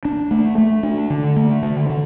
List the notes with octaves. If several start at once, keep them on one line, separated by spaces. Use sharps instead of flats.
D4
A3
A3
D4
D3
A3
D3
D3